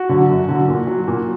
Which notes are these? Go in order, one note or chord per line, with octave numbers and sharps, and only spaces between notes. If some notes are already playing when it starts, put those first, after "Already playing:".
Already playing: F#4
D3 F#3
F#2
D3 F#3
A#2
F#3
A#2